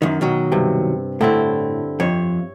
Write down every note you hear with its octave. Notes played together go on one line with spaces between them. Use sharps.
F#2 D#3
B2 D#3 F#3
G2 C3
A2 D3 C4 E4
F2 C#5